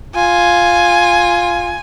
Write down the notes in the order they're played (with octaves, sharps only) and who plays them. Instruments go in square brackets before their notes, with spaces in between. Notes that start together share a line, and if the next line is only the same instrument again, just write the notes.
[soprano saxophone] F4 [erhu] G#5